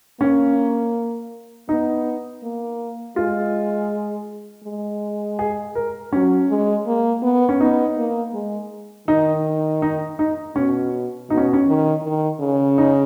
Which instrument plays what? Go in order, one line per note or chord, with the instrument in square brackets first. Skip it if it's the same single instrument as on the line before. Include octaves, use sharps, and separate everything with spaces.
[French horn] A#3 [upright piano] C#4
[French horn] B3 [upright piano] D#4
[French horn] A#3
[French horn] G#3 [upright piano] F4
[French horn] G#3
[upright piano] G#4
A#4
[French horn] F#3 [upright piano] C#4
[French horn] G#3
A#3
B3
[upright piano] C#4
[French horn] B3 [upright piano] D#4
[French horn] A#3
G#3
[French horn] D#3 [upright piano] D#4
[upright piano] D#4
D#4
[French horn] B2 [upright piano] C#4
[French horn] B2 [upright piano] D#4
[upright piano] C#4
C#4
[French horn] D#3
D#3
C#3
[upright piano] D#4